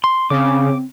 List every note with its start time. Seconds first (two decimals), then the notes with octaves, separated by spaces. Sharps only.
0.04 C6
0.30 C#3 C4 D6